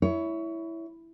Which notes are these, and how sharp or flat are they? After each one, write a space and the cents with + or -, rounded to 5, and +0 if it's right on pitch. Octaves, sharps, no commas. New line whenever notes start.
E4 +0 C#5 +20